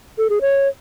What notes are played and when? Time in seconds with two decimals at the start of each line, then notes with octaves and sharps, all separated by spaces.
0.18 A4
0.30 G#4
0.41 C#5